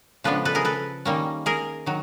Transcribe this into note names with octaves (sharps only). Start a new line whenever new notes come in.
C#3 F3 G#3 B3 D4 A4 B4
A4 B4
G#4 A#4
A4 B4
D#3 G3 A#3 C#4
G#4 A#4
D#3 F#3